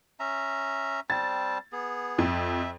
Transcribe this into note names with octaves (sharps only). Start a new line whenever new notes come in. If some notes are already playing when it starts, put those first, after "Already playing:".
C#4 E5 A#5
G3 C4 A5 A6
B3 G#4
F2 E5